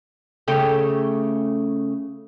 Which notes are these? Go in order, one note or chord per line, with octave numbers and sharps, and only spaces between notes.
C#3 A3 G4